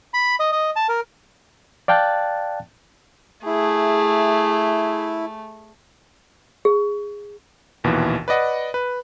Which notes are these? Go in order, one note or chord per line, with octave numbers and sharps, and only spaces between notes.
B5
D#5
D#5
A5
A#4
D5 F5 G5 A5 F#6 A6
A3 E4 G#4
G#4
A#1 D#2 B2 E3
B4 D5 D#5 F#5
B4